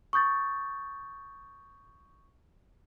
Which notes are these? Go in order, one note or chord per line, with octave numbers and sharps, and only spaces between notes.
C#6 D#6 G6 A6